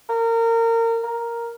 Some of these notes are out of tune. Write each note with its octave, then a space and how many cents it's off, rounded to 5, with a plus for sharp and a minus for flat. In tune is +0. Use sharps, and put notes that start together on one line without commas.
A#4 -25
A#4 +0